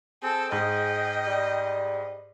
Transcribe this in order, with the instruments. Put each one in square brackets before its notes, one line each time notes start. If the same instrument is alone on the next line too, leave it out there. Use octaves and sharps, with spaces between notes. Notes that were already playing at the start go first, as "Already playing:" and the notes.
[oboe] C4 [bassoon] G#4 [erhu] A4
[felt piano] G#2 [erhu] D#5 [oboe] G5
[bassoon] G3